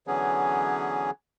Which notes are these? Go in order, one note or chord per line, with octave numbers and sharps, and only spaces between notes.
D3 E3 F#3 B3 C#4 G#4